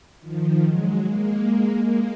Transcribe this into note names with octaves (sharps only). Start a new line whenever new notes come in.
D#3 F3
F#3 G#3
G#3 A#3
G#3 A#3